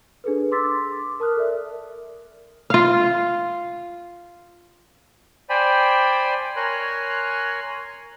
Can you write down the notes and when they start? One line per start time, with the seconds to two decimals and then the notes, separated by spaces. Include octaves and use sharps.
0.24 D4 G#4 A4 B4
0.52 C6 D6 E6 A6 B6
0.92 D6
1.20 A#4 A5 D#6 F6 F#6
1.36 A4 A#4 D5 E5
2.70 F4 F5
5.50 C5 D5 G5 G#5 B5
6.56 A#4 C#5 G#5 C6 F#6